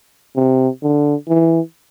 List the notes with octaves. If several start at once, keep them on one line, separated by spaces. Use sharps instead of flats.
C3
D3
E3